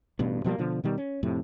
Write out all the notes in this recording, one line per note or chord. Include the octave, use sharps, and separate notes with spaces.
A1 G2 B2
B2 F3 G3 A#3
B2 D3 F3
B2 D#3 G3
C#4
F2 A2 C3